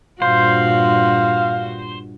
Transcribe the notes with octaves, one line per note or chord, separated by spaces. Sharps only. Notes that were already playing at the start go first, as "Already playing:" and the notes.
G2 A#2 F#4 C5 F5